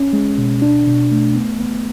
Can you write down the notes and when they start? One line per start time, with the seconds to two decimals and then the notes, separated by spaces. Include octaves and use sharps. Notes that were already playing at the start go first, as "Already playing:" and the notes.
Already playing: C#4
0.13 G#3
0.38 B2
0.62 D4
0.87 B2
1.11 A3
1.35 B3
1.60 B3